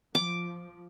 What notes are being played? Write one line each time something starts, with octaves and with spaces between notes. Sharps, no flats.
F3 D6